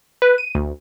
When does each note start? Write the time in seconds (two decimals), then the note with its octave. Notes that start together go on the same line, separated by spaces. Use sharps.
0.22 B4
0.38 D#7
0.55 D2